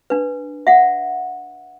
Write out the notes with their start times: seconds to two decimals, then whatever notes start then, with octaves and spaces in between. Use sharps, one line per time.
0.10 D4 B4
0.67 E5 F#5